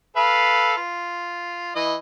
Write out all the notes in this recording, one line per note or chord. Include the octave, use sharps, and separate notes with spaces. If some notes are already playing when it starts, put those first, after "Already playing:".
A4 B4 F5
F4
E3 D#5